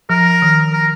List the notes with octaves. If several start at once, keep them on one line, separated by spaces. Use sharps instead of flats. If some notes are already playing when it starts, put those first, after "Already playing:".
F3 A#4
D#3
A#4